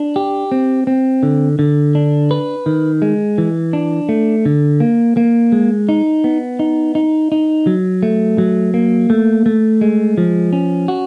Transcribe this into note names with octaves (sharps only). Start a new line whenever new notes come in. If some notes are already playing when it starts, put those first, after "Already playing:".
Already playing: D4
G4
C4
C4
D3
D3
D4
B4
D#3
G#3
E3
D4
A3
D3
A#3
A#3
G#3
D#4
B3
D#4
D#4
D#4
F#3
A3
F#3
A#3
A3
A3
G#3
F3
C#4
F#4